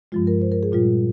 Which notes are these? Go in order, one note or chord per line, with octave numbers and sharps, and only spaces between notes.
G2 F3 G#3 F4
A#4
C5
A#4
G#4
A#2 G3 F4